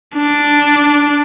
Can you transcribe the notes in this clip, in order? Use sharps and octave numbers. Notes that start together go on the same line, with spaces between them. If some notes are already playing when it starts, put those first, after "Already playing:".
D4